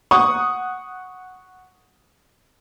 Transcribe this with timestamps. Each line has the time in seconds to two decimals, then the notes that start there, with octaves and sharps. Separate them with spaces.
0.11 F#5 C#6 D#6